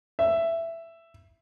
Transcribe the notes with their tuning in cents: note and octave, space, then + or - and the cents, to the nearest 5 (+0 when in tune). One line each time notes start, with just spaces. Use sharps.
E5 +10